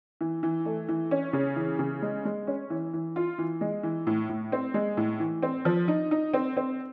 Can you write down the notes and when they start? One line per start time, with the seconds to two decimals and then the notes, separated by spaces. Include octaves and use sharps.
0.21 E3
0.43 E3
0.65 A3
0.89 E3
1.11 C#4
1.33 C#3
1.56 E3
1.79 C#3
2.02 G#3
2.25 G#3
2.47 C#4
2.70 E3
2.93 E3
3.16 F4
3.38 E3
3.61 G#3
3.83 E3
4.07 A2
4.29 A2
4.52 C4
4.74 G#3
4.97 A2
5.20 E3
5.43 C4
5.65 F3
5.88 D#4
6.11 D#4
6.34 C4
6.57 C4